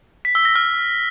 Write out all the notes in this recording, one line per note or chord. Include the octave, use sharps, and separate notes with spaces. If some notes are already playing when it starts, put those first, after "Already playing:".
B6
E6
A#6
F6